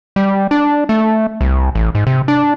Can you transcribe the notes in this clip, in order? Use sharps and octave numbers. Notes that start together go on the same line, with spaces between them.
G3
D4
A3
C2
A1
G#2
C3
D4